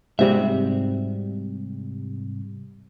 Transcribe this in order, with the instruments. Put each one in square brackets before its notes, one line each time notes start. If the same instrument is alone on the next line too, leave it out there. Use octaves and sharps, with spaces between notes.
[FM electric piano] G#2 C3 G3 [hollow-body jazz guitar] C4 F#4 E5